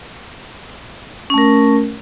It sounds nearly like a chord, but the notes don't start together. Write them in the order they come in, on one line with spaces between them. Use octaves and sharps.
C#4 A3 A#4